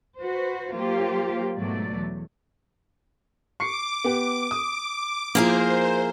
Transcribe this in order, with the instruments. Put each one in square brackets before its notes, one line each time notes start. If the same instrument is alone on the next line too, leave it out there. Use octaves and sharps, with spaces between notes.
[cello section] F#4 B4 C5
F#3 A#3 F4 G4 C5
G#2 B2 F#3 A3 D5
E2
[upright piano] C#6 C7 C#7 [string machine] D6
[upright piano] B3 G4
D#6
[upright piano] F3 E4 [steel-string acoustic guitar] A#3 G#4 A#4 [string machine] C5